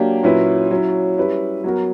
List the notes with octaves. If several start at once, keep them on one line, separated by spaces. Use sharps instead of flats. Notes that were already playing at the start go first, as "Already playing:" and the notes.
Already playing: F#3 A#3 D4 G4
A#2 F#3 C#4 E4 B4
F#3 C#4 E4
G3 C#4 E4 B4
F#3 B3 F#4 A#4